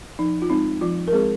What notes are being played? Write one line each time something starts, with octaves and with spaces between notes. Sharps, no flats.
F3 D#4
F4
G#3 C4 D#4
F3 F4
A#4
G#3 C4 G#4